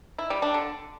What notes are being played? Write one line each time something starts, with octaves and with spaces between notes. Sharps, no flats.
E4
G3
D4
D3